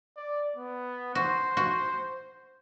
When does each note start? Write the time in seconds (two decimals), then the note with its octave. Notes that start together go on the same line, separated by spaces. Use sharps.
0.17 D5
0.56 B3
1.15 F#4 C5
1.57 F#4